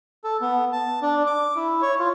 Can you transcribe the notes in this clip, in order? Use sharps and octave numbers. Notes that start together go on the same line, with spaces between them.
A4
B3
A5
D4
D6
E4
C#5
F4